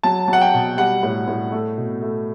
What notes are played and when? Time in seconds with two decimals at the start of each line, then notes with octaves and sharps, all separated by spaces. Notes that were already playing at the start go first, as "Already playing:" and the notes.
0.03 F#3 A5
0.28 F#3
0.33 F#5
0.41 G5
0.54 B2
0.78 G3 F#5
1.03 A2
1.28 A2
1.52 A3
1.78 B2
2.02 A3